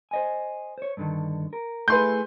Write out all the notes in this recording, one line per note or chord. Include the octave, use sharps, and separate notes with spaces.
C5 D#5 G#5
C5 C#5
G2 D3 D#3
A#4
A3 E4 G#4 B4 C6 G6